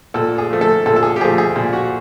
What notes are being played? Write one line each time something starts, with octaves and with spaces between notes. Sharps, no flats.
A#2 A4
G#4
F3 A3
A4
A#2 A4
A4
G#4
G4
F3 A3 G#4
G#4
A#2
F#4